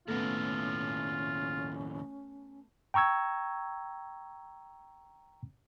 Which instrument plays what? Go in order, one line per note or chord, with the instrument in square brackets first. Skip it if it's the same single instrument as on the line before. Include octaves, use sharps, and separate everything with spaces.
[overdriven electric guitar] D#2 A2 [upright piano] A3 B3 [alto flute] C#4 [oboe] F4
[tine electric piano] G5 A#5 C#6 E6 G#6